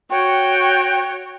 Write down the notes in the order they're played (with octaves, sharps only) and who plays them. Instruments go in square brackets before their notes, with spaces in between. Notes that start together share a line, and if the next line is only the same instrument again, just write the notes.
[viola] F#4 C#5 [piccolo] G5